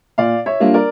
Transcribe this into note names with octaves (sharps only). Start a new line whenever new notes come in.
A#2 D5 F5
C#5 E5
G3 A#3 D4 F4
A#4 D5